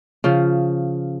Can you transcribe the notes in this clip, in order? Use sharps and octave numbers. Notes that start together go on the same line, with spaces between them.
C#3 F3